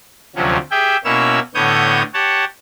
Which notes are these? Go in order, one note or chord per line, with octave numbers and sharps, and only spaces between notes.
D2 C3 F3 F#3 C#4
G4 G#4 E5 G5
B2 A#3 C#4 E4 C#5 E6
A2 D3 B3 C#5 D#6 G6
G4 C#5 F#5 A5